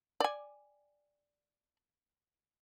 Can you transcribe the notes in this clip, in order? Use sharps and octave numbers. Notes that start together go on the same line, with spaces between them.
D5 G#5